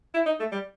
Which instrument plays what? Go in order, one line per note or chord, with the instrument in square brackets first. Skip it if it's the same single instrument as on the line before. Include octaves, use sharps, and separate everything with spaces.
[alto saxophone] E4
D#4
A3
G3